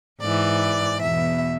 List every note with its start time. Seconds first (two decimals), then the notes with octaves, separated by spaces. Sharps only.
0.21 G#2 E3 D5
1.01 E2 B2 E5